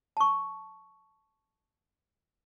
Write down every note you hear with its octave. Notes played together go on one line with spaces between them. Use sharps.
A5 C#6